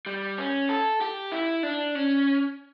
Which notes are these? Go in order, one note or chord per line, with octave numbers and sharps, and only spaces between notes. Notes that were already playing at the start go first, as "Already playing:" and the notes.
G3
C#4
A4
G4
E4
D4
C#4